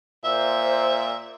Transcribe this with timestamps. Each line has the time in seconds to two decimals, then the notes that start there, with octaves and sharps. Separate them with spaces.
0.24 A#2 C5 E5 E6